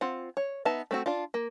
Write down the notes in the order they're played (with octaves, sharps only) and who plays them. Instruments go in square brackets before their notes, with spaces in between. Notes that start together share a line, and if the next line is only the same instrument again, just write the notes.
[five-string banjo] C4 F4 F#5
C#5
B3 D#4 E5 A5
A3 C4 F#4
D4 F4
A#3